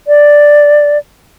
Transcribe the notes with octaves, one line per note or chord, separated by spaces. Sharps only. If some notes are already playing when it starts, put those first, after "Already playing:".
D5